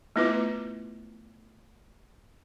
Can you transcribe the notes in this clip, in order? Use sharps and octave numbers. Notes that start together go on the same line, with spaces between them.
A3 B3 E4 F4 B4 D6